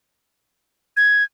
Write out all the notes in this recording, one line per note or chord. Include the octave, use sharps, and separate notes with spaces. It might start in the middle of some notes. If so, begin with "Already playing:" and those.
G#6